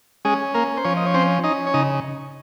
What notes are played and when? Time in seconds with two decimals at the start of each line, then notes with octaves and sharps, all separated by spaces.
0.25 G#3 C#4 G#4
0.54 A#3 A#4
0.77 C5
0.84 F3 C#4 C#5
0.97 D#5
1.06 C#5
1.14 C4 C#4 C5
1.44 C#4 D#4 D#5
1.67 C#5
1.74 C#3 D#4 D#5